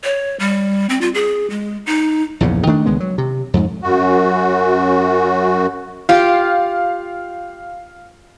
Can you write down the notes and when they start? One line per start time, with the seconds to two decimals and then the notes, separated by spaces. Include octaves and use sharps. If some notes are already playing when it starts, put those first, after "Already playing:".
0.04 C#5
0.40 G3
0.89 C4
1.01 F4
1.14 G#4
1.50 G#3
1.86 D#4
2.41 A#1 E2 G2 C#3
2.67 D#3 A3 D4
2.85 C#2 D#3 G#3 B3
3.00 F#3
3.18 C3
3.54 F2 G#2
3.83 F#2 F#4
6.09 F4 G4 F5